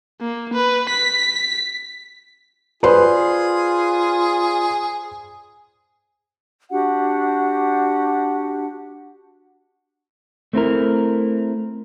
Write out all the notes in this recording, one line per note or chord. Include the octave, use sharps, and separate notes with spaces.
A#3
B4
B6
F4 G#4 B4 C5 D5 C6
D4 F#4 G4 F#5
A3 C4 E4 A#4